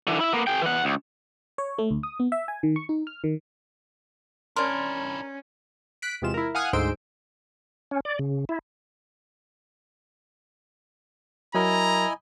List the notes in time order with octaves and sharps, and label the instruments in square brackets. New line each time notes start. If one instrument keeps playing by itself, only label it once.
[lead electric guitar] D3 E3
E4 E5
A#3 B3
G#4 G5
E3 F#5
C#2
[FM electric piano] C#5
A3
D2
D#6
B3
E5
G#5
D#3
C#6
D#4
F6
D#3
[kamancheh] C#4 [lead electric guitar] D4 E4 [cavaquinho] A#4 A5 [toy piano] D5 C6
[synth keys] F#6 B6 D7
E2 C3 G#3 F4 E7
E4 A#4
F5 F#5 G#5 D#6 F6 F#6
D2 G#2 D#4 C5 E6 D7
[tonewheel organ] C#4
D5
C#3
E4
[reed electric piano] F#3 A#4 [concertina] E4 D#5 G#5 [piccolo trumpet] A#5